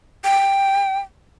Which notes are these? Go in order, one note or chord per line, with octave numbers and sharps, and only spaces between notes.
G5